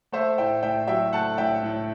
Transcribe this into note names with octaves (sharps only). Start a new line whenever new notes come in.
A3 C5 E5
A2 E5 G5
A2 E5 G5
F#3 E5 G5
A3 F#5 A5
A2 E5 G5
A2